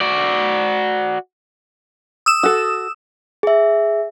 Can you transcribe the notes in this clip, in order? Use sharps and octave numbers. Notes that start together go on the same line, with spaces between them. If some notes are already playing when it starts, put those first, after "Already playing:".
F#4 D5
D#6 E6 E7
F#4 A4
G#4 E5